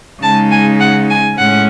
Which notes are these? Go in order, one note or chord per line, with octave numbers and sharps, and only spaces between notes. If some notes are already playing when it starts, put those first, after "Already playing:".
C#3 G#3 D#4 A5
G#5
F#5
G#5
A2 G#3 C#4 F#5